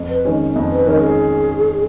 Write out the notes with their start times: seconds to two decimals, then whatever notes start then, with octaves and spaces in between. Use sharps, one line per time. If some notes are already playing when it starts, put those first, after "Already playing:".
Already playing: F2
0.09 B4
0.25 D#3 G#3 C#4
0.56 F2
0.72 B4
0.86 D#3 G#3 C#4 A#4
1.02 G#4